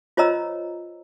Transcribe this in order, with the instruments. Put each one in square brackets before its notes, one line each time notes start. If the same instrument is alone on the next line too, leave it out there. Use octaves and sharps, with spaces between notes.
[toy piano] F4 C5 C#5 D#5 A#5 E6